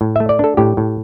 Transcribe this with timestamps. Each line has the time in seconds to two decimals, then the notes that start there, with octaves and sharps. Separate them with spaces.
0.01 A2
0.16 A3 E5
0.29 D5
0.39 D4 A4
0.57 A2 G4
0.77 A2